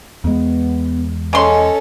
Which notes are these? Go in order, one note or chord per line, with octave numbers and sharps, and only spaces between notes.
E2 G#3 B3
C#3 C#4 A4 D#5 C6